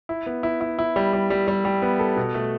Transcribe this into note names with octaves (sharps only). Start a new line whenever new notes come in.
E4
B3
E4
E4
E4
G3
G3
G3
G3
G3
B3
A4
B2
A3